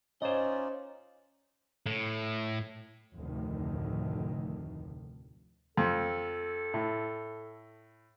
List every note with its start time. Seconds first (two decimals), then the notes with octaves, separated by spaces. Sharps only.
0.22 C#4 D#4 F4 C5 D5 D#5
1.86 A2
3.15 F1 D2 A2 D#3
5.77 F2 A4
6.74 A2